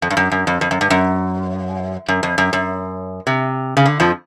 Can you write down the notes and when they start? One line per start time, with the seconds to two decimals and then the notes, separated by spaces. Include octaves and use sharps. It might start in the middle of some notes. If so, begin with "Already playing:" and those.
0.02 F2
0.10 G2
0.17 F#2
0.32 F#2
0.47 F2
0.61 F2
0.71 F#2
0.81 G2
0.90 F#2
2.08 F#2
2.23 F2
2.38 F#2
2.53 F#2
3.27 C3
3.77 C#3
3.85 D3
4.00 F2 F3